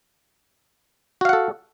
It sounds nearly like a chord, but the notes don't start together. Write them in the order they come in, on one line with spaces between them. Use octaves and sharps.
F#4 F5 F#5 A4